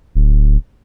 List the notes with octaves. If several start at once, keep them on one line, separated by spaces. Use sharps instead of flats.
D1